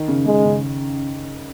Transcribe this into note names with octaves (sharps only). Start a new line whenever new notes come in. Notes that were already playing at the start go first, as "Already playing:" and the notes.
Already playing: D#3
C#3
C#3 G#3
C#3